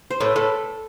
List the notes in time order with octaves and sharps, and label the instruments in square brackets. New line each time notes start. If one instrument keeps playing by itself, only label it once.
[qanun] C5
[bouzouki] A2 [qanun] B4
[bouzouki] A2 [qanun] A4